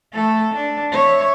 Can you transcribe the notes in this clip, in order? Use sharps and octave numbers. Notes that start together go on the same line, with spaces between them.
A3 A4
D4
C#5 E5